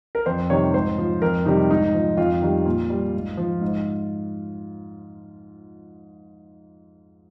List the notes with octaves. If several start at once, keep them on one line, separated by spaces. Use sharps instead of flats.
A#4
F2 C5
C3 D#3 G3 C#5
G#2 C5
F3
F2 A#4
C3 D#3 G3 D#4
G#2 D#4
F3
F2 F4
D#3 G3
A#2
G3
G#2
F3
G#2